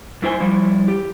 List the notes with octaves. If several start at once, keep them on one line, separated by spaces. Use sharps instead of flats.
F#2 E4 C5 G#5
F3 G3 E4
G4